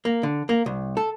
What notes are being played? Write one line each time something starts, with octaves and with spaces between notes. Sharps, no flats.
A#3
D3
A#3
C2
A4